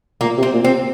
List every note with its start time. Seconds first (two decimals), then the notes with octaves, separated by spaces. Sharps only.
0.21 A#2 A#3
0.38 C3
0.43 C4
0.53 A#2
0.65 C4